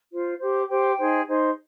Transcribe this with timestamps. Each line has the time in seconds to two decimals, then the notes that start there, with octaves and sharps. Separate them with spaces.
0.10 F4 C5
0.39 G4 C5
0.68 G4 C5 G5
0.98 D#4 G#4 C5
1.26 D#4 G#4 C5